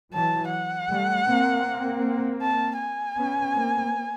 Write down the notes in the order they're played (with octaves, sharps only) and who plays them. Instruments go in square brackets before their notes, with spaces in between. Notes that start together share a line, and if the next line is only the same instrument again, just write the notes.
[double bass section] E3 F#3 [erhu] A5
[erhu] F#5
[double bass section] G3 A3
A#3 C4
[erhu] A5
G#5
[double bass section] B3 C#4
A#3 C4